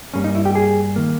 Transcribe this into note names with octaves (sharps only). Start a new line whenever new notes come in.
G2 G3 A#3 C#4
D#4
E4
G4
G#4
D#3 A#3